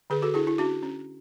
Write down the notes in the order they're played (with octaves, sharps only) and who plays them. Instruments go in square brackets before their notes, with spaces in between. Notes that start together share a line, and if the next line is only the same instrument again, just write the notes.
[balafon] D3 G#4 B4
F#4 A4
D4 E4 G#4
E4
C#4 D4 F#4
C#4